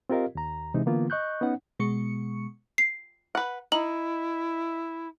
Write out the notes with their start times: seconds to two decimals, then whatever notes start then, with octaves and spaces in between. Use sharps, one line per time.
0.09 C4 F4 G4 A#4 D#5 F5
0.35 D#2 A#5
0.74 C3 E3 G#3 D#4
0.86 D3 E3 A#3 B3 F4
1.10 D#5 C#6 F#6 G6
1.41 B3 C#4 D#4 F#5
1.80 B2 G#3 C#6 C#7
2.78 C7
3.35 B4 F#5
3.72 D#4 E4 F#7